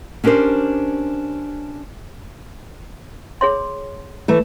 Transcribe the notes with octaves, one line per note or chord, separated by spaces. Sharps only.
C#4 D4 G4 A#4 C5
G#4 C#5 C6
E3 A3 A4